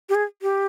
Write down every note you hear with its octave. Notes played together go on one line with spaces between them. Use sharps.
G4
G#4
G4